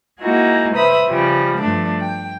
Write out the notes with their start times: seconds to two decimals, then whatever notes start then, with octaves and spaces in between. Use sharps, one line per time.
0.20 A#3 D#4 E4 F#4 G#4
0.75 C#3 B4 C5 E5 B5 D#6
1.07 C#3 F3 G3
1.60 G2 F3 A3 D4
1.99 G5